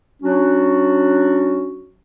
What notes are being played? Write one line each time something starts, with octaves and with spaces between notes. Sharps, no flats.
F#3 C#4 D4 F#4